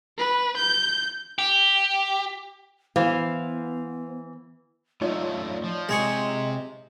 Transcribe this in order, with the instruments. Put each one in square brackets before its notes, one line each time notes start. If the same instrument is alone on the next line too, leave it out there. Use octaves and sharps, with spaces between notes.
[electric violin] B4
G6
[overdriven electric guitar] G4
[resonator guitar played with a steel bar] E3 [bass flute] B3 [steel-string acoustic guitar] C5 F5
[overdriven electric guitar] F#2 A2 [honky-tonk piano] D#4 F4 C#5 [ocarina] D5
[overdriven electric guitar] F3
[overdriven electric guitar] C3 C5 [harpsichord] G#3 G#4 C#6 [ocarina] D#5